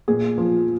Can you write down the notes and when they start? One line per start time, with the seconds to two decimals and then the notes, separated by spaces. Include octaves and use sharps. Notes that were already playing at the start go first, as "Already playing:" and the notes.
0.08 A#2 G#4
0.38 F3